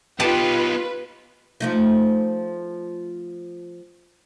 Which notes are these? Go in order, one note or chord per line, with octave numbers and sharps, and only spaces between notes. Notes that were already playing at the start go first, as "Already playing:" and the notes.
B3 D#4 F4 G4 B4 A5
F3 A3 D#4